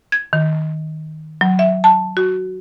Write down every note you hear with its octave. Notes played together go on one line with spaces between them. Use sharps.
G#6
D#3
F#3
E5
A5
F#4